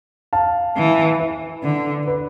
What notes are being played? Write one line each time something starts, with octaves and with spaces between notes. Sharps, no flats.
F5 A5
E3
B4
D3
B4